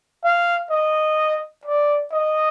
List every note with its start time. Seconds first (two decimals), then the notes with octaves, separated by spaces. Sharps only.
0.24 F5
0.71 D#5
1.65 D5
2.12 D#5